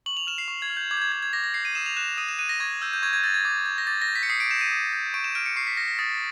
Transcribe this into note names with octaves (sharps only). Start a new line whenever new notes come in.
C#6 F#7
F7
F6 E7
C7
C#6
G#6
F6
G6
D6 G#6
G6
G#6
G6 G#6
G#6
D6 A#6
A#6
G6 C7
D#7
D#6 E7
F7
F#6 E7
D#6 D#7
E7
F#6 D#7
A#6
C#6 G#6
E6 G6
G6
C#6 G#6
G#6
E6 G6 A6
G#6
D6
G6
A#6
D6 A6
A#6
G6
B6
C#7
D#6 C7
D7
G6 E7
D#7
D#6
G6
C#6 D7
E7
F6 D7
C#7
C#6 C7
B6
F6 A#6
A#6
D#6 A6